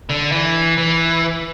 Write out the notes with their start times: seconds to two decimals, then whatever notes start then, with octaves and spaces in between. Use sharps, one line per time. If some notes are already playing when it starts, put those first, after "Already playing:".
0.10 D3
0.32 E3
0.78 E3